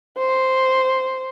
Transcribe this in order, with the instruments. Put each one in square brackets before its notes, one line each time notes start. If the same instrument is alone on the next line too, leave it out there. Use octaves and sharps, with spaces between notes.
[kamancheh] C5